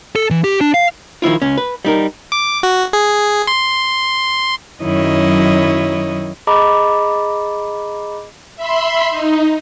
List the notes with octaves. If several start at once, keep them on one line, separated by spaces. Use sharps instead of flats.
A4
E3
G4
D4
F5
D#3 F3 E4 F4
C#2 C#4
B4
G3 D#4 A#4
D6
F#4
G#4
C6
F#2 D#3 F#3 E4 C#5 D#5
G#4 D#5 A#5 B5 D6
E5 B5 C6
D#4